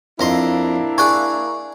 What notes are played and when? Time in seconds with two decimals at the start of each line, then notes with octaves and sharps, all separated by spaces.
0.20 F2 A#3 D4 E4 D#5 C6
0.98 G#4 D5 G#5 C#6 F#6